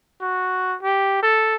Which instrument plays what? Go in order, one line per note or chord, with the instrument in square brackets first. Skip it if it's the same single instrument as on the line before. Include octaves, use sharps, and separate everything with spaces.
[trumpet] F#4
G4
A4